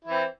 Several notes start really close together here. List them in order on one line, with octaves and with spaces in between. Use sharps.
E4 E3 C4